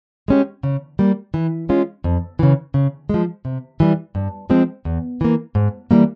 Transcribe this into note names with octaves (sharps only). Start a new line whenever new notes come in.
G#3 C#4 G4
C#3
G3 A#3
E3
G#3 C#4 F4
F2
C#3 E3
C#3
F3 G#3
C3
E3 G3
G2
F3 G#3 C4
E2
E3 A#3
G#2
E3 G3 A#3